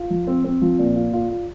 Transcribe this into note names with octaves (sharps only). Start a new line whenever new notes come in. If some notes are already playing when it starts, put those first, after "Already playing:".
Already playing: F4
F3
C4
C4
F3
A#2
F4
F4
F4